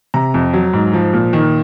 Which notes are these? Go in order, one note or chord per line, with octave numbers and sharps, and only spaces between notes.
C3 A#5
F2
F#3
G#2
F3
A#2
D#3